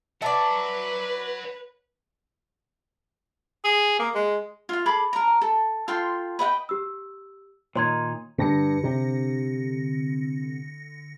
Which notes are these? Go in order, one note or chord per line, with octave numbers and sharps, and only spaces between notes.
B4 C#5 D5 E5 F#5 A5
G#4
A#3
G#3
F4 F5
G#4 A4 B5 D6
A#4 A#5
A4
F4 A4 G5 C6
B4 D#5 F#5 G5
G4 E6
A#2 D#3 D#4 C#5 C6 G#6
G2 D3 A#6 C#7
C3